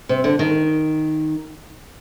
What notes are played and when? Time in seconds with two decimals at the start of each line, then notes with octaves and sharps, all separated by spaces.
0.09 C3
0.24 D3
0.39 D#3